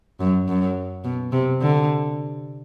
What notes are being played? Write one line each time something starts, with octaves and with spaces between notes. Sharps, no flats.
F#2
F#2
B2
C3
D3